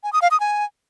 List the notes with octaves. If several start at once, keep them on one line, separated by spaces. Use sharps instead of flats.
G#5
D#6
F5
D#6
G#5